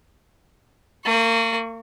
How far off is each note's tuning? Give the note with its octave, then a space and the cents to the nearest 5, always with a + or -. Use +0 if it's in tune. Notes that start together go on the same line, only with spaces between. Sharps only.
A#3 -35 C#6 +0